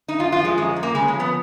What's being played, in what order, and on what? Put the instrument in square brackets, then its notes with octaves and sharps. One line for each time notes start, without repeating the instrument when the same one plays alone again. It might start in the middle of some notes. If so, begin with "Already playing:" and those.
[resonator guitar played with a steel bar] D#4
F#2 F4
F4
F3
G#3
F#2 G#3
F#2
A#3
C#3 G#3
G#3
F3
B3